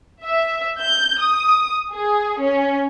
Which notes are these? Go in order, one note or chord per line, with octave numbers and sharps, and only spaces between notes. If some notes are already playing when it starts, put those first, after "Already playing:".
E5
G6
D#6
G#4
C#4